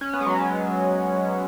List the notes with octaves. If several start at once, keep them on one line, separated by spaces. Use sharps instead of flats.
C#4
B3
G#3
F#3